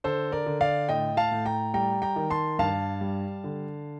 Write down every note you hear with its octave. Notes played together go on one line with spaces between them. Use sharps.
D3 A4 C5
A#4 D5
D3
D5 F5
A2 D#5 G5
F5 A5
A2
G5 A#5
G3 G5 A#5
G5 A#5
D#3
A5 C6
G2 F5 A5
G3
D3